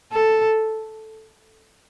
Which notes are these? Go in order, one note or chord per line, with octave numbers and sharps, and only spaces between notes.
A4